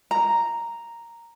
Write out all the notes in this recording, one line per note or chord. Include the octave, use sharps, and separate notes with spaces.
A#5